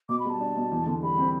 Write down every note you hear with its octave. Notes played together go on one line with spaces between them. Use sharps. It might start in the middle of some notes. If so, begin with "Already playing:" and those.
B2 D6
B5
G3 A5
D4
B2
E2
D3
G3 B5
C4